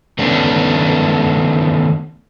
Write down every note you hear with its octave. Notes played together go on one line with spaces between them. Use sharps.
D#3 A3 B3 C#4 D4